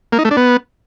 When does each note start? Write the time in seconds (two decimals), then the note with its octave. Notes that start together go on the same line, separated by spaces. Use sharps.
0.12 A#3
0.19 D#4
0.25 A3
0.31 D4
0.37 B3